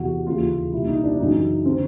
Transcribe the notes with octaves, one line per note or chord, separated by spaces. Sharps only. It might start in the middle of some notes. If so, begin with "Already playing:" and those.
Already playing: E2 C3 E3 F#4
D#2 C#3 E3 F4
C2 A#2 E4
D#4
D4
F#2 C#3 E3 D#4
D3 C4